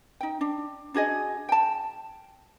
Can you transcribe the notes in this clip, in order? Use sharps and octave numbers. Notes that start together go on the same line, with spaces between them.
D#4 G5
D4
D4 F#4 G#4 D#5
G5 A5